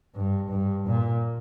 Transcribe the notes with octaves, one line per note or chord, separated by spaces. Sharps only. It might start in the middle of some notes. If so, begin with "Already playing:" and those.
G2
G2
A#2